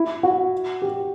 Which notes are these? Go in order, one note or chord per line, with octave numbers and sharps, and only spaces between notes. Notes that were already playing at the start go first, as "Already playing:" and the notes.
Already playing: E4
F#4
G4